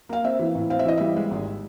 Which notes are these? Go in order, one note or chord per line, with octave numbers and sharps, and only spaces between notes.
A#3 F5
C4 E5
E3
A2
C4 F5
E5
E3 D#5
G3 E5
G#3
G#1